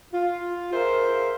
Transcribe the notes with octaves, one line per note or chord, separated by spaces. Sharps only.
F4
G#4 A#4 C5 E5 F5